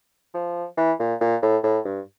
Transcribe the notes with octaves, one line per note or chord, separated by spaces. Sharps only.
F3
E3
A#2
A#2
A2
A2
G2